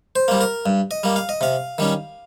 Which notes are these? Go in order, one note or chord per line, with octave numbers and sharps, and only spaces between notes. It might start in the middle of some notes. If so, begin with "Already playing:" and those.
C5
G3 A#3
A#4
G2
D#5
G3 A#3
F5
D#5
C3 F5
D#3 G3 C#4